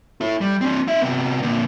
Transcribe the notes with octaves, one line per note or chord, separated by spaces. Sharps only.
E4 A4
G3
C4 D4
D#4 E5
C3 B3
A#2 D3